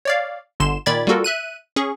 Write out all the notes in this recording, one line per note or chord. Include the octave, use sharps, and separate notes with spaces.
C#5 D5 F5
G1 D3 C6 E7
A#2 D#3 D5 B5 G#6 A6
G3 A#3 F4 F#4 A4 A#4
E5 F#6 D#7
C#4 G#4 C#6